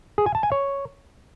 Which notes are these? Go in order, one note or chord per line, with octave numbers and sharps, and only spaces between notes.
G#4
G#5
A5
G#5
C#5